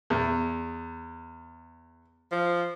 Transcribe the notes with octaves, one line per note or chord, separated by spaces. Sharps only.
E2
F3